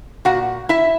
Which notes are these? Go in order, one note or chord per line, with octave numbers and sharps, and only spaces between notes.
A#2 F#4 F#5
E4 E5